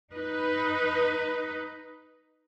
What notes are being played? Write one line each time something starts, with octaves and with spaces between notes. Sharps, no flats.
D#4 B4